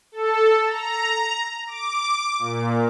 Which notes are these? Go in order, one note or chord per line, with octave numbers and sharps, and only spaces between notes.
A4
A#5
D6
A#2